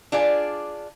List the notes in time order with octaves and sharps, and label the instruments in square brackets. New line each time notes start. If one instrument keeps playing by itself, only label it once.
[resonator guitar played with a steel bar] D4 F4 G#4 D5